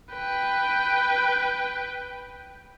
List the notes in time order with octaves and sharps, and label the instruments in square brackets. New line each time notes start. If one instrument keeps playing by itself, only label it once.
[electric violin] B4 G5